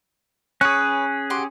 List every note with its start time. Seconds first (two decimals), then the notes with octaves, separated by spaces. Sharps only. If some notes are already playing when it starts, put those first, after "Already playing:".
0.61 C#4 G#4 B4 C#5 C#6 F#6
1.30 F#4 G4 C6